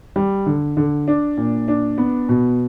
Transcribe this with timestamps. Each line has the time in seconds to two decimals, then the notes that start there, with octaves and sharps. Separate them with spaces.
0.16 G3
0.46 D3
0.77 D3
1.08 D4
1.38 A#2
1.68 D4
1.98 B3
2.29 B2